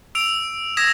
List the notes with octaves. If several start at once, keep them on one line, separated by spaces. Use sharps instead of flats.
E6 D7 F7
D#6 E6 G#6 A#6 B6 E7